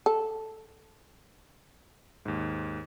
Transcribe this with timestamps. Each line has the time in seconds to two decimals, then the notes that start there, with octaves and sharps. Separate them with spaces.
0.06 A4
2.25 D#2 G#2